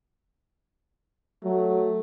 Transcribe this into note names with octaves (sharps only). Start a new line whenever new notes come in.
F#3 A3